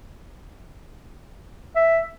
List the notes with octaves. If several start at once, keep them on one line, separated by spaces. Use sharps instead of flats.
E5